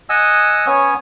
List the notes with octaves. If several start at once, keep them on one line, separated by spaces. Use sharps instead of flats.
D#5 F#5 G#5 E6
B3 C#4 C#5 G#5